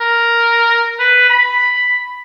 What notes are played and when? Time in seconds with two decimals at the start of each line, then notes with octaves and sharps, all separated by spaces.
0.01 A#4
0.99 B4
1.29 B5